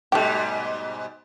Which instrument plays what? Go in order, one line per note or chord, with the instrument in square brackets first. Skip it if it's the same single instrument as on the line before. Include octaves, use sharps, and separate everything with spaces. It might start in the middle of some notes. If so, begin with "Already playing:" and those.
[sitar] G#2 B2 G3 [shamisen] A3 G4